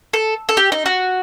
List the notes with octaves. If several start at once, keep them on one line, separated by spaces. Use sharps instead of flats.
A4
A4
G4
D#4
F#4